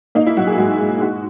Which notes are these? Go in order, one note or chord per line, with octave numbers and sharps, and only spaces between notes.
A#3 D#4
E4
F#3 F#4
G#4
G#2 F#4
G#2
G#3 F#4